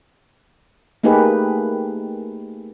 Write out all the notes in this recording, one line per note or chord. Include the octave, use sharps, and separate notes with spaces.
A3 A#3 D#4 G4 G#4 B4